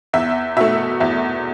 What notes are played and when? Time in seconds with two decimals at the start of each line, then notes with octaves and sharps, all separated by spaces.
0.13 E2 E5
0.56 B2 A3 E5
1.00 E2 E5